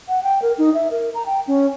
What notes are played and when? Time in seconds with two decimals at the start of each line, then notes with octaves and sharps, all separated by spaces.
0.08 F#5
0.23 G5
0.42 A#4
0.58 D#4
0.74 E5
0.91 A#4
1.14 A#5
1.26 G5
1.47 C#4